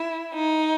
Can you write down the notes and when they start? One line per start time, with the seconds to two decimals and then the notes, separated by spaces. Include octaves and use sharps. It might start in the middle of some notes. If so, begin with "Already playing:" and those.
Already playing: E4
0.34 D#4